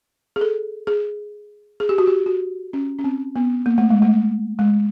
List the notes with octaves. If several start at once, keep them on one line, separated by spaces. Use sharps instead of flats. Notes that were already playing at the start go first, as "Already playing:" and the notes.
G#4
A4
G#4
G#4
G4
F#4
G4
F#4
C#4
C#4
C4
B3
A#3
A3
G#3
A3
G#3